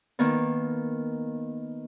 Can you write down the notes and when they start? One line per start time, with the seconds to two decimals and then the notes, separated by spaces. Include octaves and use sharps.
0.19 D#3 A#3 B3